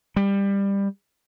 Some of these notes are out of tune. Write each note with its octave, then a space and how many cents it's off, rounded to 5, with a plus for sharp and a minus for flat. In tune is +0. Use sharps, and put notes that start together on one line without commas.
G3 +20